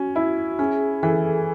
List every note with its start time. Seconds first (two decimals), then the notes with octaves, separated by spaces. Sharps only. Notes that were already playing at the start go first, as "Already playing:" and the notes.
Already playing: C#4 F#4
0.16 E4
0.59 C#4 G#4
1.03 E3 A4